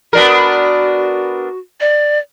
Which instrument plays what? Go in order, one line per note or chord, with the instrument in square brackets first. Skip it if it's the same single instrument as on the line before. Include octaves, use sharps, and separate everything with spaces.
[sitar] B3 D4 A#4 [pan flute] F#4
[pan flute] D5